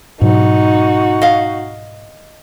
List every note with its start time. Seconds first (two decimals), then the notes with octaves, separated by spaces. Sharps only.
0.21 G#2 B2 F#3 D#4 F#4
1.22 D#5 F5